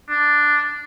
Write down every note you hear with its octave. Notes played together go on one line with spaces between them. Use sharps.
D4